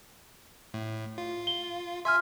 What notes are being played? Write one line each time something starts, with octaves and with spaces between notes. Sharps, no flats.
A2
F4
G7
E5 G#5 C6 F6